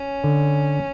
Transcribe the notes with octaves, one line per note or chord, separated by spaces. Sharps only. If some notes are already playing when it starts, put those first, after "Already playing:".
Already playing: C#4
D3